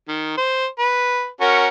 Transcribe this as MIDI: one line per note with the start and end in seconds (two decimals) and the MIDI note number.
0.08 0.35 51
0.37 0.66 72
0.79 1.28 71
1.41 1.68 61
1.41 1.68 66
1.41 1.68 70